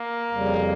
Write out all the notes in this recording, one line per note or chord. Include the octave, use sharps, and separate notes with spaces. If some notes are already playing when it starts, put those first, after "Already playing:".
Already playing: A#3
F2 C#3 G3